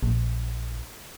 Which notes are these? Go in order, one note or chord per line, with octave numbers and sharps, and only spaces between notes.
A#1